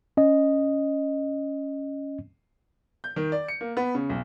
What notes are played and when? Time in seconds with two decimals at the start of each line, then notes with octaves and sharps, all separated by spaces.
0.17 C#4 D#5
3.04 G6
3.16 D#3
3.32 D5
3.48 C#7
3.61 A#3
3.77 B3
3.95 C#3
4.10 B1